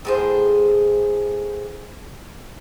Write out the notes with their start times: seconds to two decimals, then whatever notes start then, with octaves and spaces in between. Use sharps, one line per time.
0.05 A2 G#4 C5